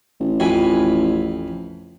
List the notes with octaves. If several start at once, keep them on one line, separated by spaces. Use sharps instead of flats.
A1
F2 G#5 B5